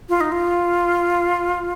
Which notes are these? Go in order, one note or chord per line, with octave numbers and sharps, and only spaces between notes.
F4
D#4
F4